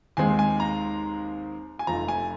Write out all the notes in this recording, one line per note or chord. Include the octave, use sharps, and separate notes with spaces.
D#2 D#3 G#3 C4 G#5
G#5
A#5
G#5
F1 F2 F3 A#5
G#5